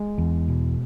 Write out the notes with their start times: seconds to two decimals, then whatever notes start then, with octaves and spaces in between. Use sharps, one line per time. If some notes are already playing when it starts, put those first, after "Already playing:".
Already playing: G#3
0.18 E2
0.48 B2